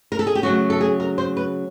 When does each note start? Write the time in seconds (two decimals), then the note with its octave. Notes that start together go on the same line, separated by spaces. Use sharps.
0.12 A#4
0.19 A4
0.27 G#4
0.35 G4
0.42 C#3 F#3 A3 F#4
0.70 A4
0.81 G#4
1.00 A#4
1.18 C5
1.37 B4